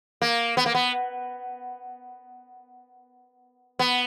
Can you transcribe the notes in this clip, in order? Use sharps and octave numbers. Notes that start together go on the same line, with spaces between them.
A#3
B3
A#3
B3
B3